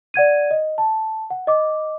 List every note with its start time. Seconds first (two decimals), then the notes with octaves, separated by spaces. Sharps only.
0.14 D5 F#5 G#6 D#7
0.51 D#5
0.78 A5
1.30 F#5
1.47 D#5 D6